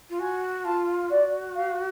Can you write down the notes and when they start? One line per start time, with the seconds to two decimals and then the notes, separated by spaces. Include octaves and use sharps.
0.10 F4
0.19 F#4 G#5
0.64 F4 A5
1.10 F#4 D5
1.55 F5